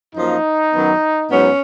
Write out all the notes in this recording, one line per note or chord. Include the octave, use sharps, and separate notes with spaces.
F#2 F3 A#3 D#4
F#2 D#3 F#3 B3
G#2 F#3 B3 C#4